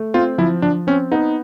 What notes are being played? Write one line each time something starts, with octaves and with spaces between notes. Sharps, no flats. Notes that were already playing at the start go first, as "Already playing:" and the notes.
Already playing: A3
C4 F4
F3 E4
F3 D4
C4 C#4
B3 D#4